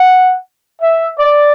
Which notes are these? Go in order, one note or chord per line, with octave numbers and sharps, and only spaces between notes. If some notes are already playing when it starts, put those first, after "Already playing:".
Already playing: F#5
E5
D5